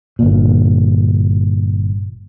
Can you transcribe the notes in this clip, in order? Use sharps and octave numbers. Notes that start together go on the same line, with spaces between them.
G1 A#2